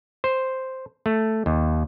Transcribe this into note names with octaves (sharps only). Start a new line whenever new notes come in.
C5
A3
D#2